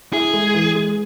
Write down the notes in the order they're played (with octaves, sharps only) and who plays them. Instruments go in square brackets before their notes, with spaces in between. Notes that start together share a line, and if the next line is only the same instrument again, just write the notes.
[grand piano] E4 [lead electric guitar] G#4
[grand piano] G#3
E3
G#3